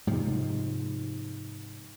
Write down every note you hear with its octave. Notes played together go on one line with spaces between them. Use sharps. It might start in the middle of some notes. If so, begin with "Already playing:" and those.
G#2 C3 F3